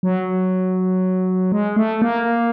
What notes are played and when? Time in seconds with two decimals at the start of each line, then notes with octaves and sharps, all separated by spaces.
0.03 F#3
1.52 G#3
1.77 A3
2.02 A#3